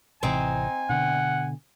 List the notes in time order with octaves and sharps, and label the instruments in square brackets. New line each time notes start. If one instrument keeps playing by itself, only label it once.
[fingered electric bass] A1 C3 E3 [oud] C4 D#4 [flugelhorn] G#5
[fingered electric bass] B2 D3 [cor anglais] F#5